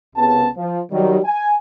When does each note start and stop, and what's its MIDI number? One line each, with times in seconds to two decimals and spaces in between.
0.16 0.48 36
0.16 0.48 49
0.16 0.48 59
0.16 0.48 81
0.57 0.81 53
0.92 1.19 51
0.92 1.19 54
0.92 1.19 55
1.25 1.55 80